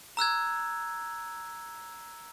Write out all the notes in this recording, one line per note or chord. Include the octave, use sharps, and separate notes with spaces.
A#5 E6 F#6 G#6